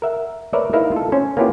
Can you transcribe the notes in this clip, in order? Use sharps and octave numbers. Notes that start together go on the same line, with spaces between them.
A#4 E5 F#5
A#4 B4 C#5 D5 E5
D#4 E4 A#4 B4 E5 F5
F4 A4
C#4 C5
A#3 B3 C#4 E4 F4 G4